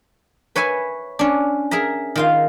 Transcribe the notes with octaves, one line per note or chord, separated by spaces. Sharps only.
B4 C#5 E5 G#5
C#4 D4
G#4 A#4 E5 A#5
D#3 F4 F5